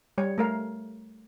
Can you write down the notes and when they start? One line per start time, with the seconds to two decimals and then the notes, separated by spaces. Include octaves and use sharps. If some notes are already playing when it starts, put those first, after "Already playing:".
0.18 G3 C#5
0.38 A3 A#4 F5